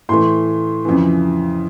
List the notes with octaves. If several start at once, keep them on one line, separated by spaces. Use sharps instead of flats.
A2 E3 A3 C6
F2 C#3 E3